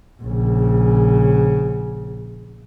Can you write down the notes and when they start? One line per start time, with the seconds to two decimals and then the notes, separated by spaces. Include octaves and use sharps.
0.23 A#1 C#3